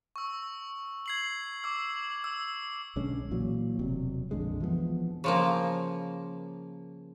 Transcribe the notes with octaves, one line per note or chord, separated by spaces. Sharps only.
C#6 E6
G#6 C7 F#7
D6 E6
E6
B1 D3 G#3 C#4
A#2 E3 F#3
E1 C3 F#3
A#1 F2 D3 G#3
E3 F3 G#3 B3
C#3 F3 A#3